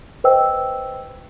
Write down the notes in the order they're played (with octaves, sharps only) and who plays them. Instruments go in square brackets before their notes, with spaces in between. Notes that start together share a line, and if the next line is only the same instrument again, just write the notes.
[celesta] B4 C5 D#5 G5 E6